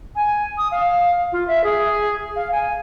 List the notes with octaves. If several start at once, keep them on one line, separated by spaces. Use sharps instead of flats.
G#5
D#6
F5
F4
E5
G#4
F5
G#5